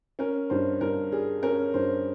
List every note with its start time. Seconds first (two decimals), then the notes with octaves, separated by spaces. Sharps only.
0.19 C#4 A#4
0.50 G2 C5
0.81 G2 A#4
1.12 G3 G#4
1.43 C#4 A#4
1.74 G2 C5